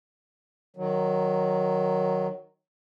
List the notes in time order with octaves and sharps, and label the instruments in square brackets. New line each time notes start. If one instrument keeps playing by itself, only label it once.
[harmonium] D#3 F#3